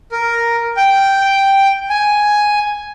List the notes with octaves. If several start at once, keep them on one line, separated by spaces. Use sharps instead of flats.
A#4
G5
G#5